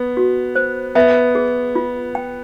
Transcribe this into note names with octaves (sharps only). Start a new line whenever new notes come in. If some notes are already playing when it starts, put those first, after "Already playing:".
Already playing: B3
F#4
C5
B3 E5
G#4
F4
G5